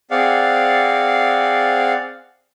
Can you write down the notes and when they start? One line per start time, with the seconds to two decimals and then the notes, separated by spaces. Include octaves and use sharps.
0.11 C4 G#4 D5 F5 F#5